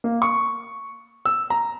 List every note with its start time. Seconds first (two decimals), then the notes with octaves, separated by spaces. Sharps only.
0.04 A#3
0.22 C#6
1.25 E6
1.50 A#5